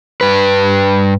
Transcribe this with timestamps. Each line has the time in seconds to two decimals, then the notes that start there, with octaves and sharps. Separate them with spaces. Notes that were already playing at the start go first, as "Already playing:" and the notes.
0.21 G2 B4